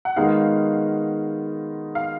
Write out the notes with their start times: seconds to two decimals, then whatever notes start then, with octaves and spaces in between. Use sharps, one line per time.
0.05 F#5
0.16 D#3 G#3 B3 D#4 F#4 F5
1.95 F5